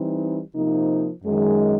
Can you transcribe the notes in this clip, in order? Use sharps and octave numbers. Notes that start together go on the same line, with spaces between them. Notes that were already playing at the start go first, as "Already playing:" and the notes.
Already playing: E3 G3 C4 D#4
C3 F3 A#3 D#4
F#2 D#3 G#3